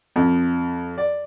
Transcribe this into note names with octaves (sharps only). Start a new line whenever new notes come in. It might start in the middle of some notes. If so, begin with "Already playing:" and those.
F2
D5